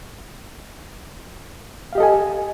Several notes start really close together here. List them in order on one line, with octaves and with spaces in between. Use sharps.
F5 G4 D#5 A4 G#5